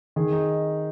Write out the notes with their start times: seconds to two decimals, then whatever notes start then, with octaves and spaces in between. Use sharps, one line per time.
0.16 D#3 G#4
0.33 D#4